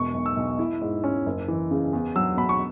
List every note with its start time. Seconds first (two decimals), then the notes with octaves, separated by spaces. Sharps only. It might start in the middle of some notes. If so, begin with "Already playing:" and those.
Already playing: E1 B2 C#6
0.14 B1
0.26 E6
0.37 B1
0.59 E4
0.81 G#2
1.04 C#4
1.26 F#1
1.48 E3
1.71 C#3
1.93 E2
2.16 F#3 E6
2.37 B2 B5
2.49 C#6